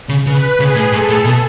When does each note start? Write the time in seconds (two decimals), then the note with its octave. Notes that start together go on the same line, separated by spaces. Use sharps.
0.09 C#3
0.26 C#3 B4
0.59 C#3 G#4
0.75 A2
0.92 G#2 A4
1.08 A2
1.25 B2